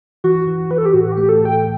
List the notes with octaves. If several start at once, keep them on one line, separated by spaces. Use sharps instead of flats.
E3 F#4
E3
E3 B4
A4
G4
A2 F#4
G4
A3
A4
A2
G5